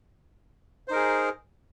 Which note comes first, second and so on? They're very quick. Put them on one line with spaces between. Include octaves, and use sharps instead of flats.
C5 D#4 A#4 G#4